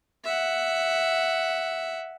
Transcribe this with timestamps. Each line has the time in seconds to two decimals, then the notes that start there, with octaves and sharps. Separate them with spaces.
0.24 E5 F#5